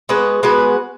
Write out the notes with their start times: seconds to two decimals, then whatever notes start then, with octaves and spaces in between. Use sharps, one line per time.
0.09 G#3 B3 F#4 B4
0.43 G#3 B3 F#4 B4